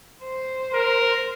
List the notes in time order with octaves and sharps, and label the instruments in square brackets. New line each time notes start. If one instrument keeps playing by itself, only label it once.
[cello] C5
[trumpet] A#4